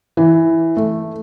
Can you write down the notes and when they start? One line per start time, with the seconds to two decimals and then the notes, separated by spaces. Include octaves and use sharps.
0.17 E3
0.77 A3